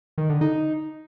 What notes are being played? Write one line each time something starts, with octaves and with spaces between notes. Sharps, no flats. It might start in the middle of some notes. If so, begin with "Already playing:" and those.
D#3
D3
D#4